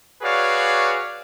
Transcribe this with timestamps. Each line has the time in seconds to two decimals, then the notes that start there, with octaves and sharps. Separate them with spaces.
0.22 F#4 G#4 B4 C#5 D5 F5